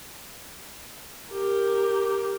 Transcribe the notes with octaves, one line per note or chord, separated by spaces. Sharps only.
G4 A#4